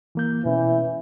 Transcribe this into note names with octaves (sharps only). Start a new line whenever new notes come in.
E3 A#3 G6
B2 E3 B3 C#4